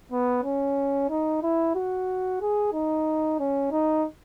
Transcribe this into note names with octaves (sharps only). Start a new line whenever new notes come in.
B3
C#4
D#4
E4
F#4
G#4
D#4
C#4
D#4